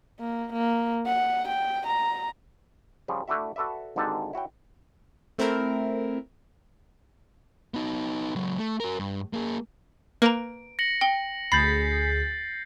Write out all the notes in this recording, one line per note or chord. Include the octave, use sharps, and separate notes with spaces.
A#3
A#3
F#5
G5
A#5
C#3 F3 G3
A3 D4 E4 F#4 E5
F#4 A4 B4 D5 E5
G#1 G#2 D3 G4 A4 A5
E4 F#4 C#5 G5
A3 C4 E4 A#4
B3 D#4
C#2 F#3
A3
F#4 A#4
G2
A#3 G#4
A#3 B4 A#5 D7
A#6 C#7 F#7
G5 G7
D2 G#4 B5 G6 A6 B6 C7 F#7